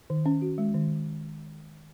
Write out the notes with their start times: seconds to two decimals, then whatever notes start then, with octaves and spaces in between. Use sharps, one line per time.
0.10 D#3
0.26 C#4
0.42 F#4
0.58 G#3
0.74 D#3